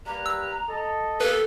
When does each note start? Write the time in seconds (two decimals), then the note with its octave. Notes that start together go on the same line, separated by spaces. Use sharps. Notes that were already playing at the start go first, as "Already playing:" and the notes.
0.06 G3 A#3 B4 A#5
0.26 E6
0.69 A4 D#5
1.20 A#3 B3 G4 A4 B4